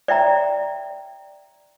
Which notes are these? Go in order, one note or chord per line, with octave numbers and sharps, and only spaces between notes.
D5 E5 G5 A#5